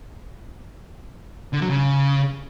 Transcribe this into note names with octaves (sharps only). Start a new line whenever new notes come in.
D3
F#3
C#3